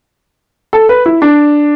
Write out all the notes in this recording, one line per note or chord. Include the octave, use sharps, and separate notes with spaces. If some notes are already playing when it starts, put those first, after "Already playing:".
A4
B4
E4
D4